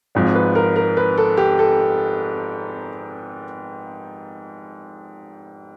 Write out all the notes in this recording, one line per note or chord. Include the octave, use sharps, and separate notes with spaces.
G#1 G#2 F3
B4
A#4
A#4
B4
A4
G4
A4